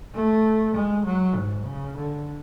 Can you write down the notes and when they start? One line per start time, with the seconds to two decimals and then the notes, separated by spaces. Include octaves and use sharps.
0.14 A3
0.75 G#3
1.06 F#3
1.35 G#2
1.65 C#3
1.96 D3